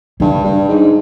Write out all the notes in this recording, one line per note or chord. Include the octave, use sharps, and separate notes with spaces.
G2 C#3
G2
G#2